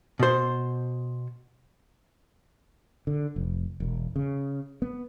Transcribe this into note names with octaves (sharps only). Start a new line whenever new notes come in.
B2 C5
D3
F1
E1
C#3
B3